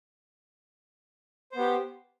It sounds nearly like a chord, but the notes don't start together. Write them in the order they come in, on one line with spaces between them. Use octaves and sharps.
C5 B3 G4